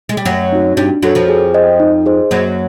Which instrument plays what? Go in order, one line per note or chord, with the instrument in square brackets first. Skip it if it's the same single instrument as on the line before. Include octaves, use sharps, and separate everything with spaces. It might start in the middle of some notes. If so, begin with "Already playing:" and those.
[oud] G#3
G3
[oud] F#2 F#3 [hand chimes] A3
[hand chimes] C4 D#4 F#4
[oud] G2 G3 [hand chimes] D4
[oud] F#2 F#3 [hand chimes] F#4 A4 C#5
[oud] F2 F3
[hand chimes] G#4
C5 D#5 G5
D#4
G#4 C5 D#5
[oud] F#2 F#3 [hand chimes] A#3